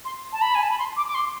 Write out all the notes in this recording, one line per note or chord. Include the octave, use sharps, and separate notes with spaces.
C6
A5
B5
G#5
A5
B5
C6
D6
D6
C6